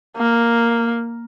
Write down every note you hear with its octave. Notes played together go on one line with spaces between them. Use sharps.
A#3